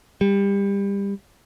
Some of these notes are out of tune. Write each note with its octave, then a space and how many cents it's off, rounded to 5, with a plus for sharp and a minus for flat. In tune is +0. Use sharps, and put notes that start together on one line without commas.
G3 +25